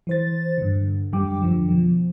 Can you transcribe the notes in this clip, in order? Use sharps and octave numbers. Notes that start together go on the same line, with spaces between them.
E3 C5 A6
G2 D3
F#2 D3 G3 G5 D6
F2 D3 F3
B2 F3